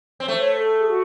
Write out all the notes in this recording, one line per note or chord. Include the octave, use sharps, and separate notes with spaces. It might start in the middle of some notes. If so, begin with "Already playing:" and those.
C4 C#5
A3 C5
C#5
C5
A4
G#4
F#4